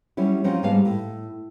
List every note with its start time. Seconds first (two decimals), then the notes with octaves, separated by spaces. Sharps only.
0.17 F#3 G3 C#4 E4
0.44 F3 F#3 C4 C#4 D#4 F4
0.62 G#2 G3 G#3 B3 F5 A5
0.85 A2